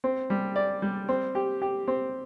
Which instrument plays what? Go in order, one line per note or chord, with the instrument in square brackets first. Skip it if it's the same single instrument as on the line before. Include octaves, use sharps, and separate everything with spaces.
[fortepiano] C4
G3
D5
G3
C4
G4
G4
C4